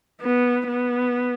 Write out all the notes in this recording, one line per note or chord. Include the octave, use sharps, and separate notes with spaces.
B3
B3